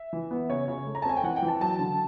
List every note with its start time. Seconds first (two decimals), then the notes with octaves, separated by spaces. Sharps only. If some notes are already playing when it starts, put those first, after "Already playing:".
Already playing: E5
0.13 E3
0.31 B3
0.49 C#3 C#5
0.68 C#3
0.87 A3
0.95 A#5
1.02 A5
1.05 C4 G#5
1.16 G5
1.23 E3 F#5
1.36 G5
1.42 E3
1.48 A5
1.61 F#3 A5
1.79 D3